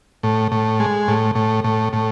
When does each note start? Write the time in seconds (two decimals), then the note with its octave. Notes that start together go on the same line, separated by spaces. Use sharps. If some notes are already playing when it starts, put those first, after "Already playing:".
0.23 A2
0.52 A2
0.80 G#3
1.08 A2
1.35 A2
1.64 A2
1.93 A2